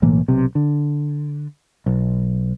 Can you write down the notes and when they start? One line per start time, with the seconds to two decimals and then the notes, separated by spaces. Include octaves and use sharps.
0.02 B1 A2 E3 A#3
0.28 B1 C3
0.55 D3
1.86 B1